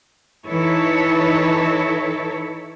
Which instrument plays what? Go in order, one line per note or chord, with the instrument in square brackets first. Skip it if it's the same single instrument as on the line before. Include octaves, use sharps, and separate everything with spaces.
[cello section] E3 D#4 E4 A4 B4 C#5